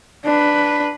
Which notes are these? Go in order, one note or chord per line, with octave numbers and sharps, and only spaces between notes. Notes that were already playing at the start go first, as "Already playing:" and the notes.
D4 B4